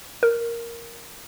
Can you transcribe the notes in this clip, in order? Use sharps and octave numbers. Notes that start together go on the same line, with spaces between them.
A#4